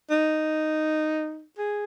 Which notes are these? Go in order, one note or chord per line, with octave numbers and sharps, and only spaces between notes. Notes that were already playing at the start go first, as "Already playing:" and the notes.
D#4
G#4